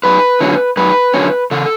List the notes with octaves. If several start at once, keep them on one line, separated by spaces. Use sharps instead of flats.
F#2 B4
D3 F#3 C#4
F#2 B4
D3 F#3 C#4
C#3 A4